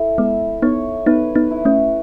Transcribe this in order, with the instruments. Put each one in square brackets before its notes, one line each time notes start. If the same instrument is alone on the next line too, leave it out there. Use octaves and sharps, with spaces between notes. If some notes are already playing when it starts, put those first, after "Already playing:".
Already playing: [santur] E4 A4
[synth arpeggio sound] G#3 B3 [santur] E5
[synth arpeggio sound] B3 D#4 [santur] C#5
[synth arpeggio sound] B3 D#4 [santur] B4
[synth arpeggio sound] B3 D#4
[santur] E4
[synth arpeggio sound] A3 C#4